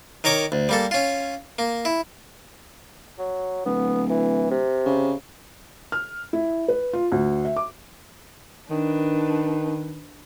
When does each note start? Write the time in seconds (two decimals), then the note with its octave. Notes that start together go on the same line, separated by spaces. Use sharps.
0.24 D#3 A#4 C#5 D6
0.52 D2
0.69 G3 A#3 A4
0.91 C#4 F4
1.59 A#3
1.85 E4
3.19 F#3
3.65 D1 B3
4.10 E3
4.51 C3
4.86 C#3
5.92 F6
6.33 E4
6.68 B4
6.93 F4
7.12 D2
7.45 E5
7.56 D6
8.70 D#3 D4 B4